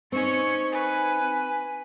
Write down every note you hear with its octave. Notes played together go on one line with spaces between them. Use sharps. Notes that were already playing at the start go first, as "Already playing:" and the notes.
C4 C#4 D#4 C#6
B4 G#5